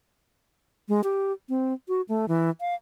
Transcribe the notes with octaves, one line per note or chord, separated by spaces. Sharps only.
G#3
G4
C4
F#4
A3
E3
F5